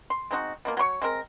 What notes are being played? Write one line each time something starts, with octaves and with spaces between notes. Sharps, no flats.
C6
G#3 C4 D#4 F#4
B2 F3 A#3
F#3 C#5 C6 C#6
G#3 C4 A#4